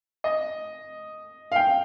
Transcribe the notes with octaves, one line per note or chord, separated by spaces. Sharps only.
D#5
F5
G5